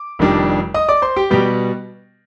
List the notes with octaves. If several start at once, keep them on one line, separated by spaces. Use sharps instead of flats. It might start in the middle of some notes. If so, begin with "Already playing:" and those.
Already playing: D6
F1 F2 D#3 G3 D4
D#5 D#6
D5 D6
C5 C6
G4 G5
B2 G3 B3 G4 G5